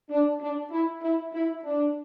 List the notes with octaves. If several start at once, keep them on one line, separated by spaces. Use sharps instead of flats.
D4
D4
E4
E4
E4
D4